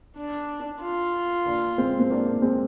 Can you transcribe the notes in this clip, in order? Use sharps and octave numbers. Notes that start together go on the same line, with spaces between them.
D4
F4
A#3 D4
G#3 C4
C4
A#3 D4
A#3 D4
G#3 C4